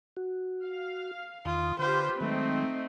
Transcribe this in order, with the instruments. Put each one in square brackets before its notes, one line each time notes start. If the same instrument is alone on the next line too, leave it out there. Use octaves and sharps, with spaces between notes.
[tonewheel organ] F#4
[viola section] F5
[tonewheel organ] E2 D#3 D#6 [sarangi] F4
[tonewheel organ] D3 [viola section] F4 G4 B4 [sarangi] C5
[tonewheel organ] D#3 F#3 G#3 [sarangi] A3 [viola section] C4 D#4